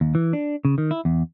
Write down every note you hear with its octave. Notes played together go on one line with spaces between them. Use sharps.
D#2
E3
D4
C#3
D#3
E4
E2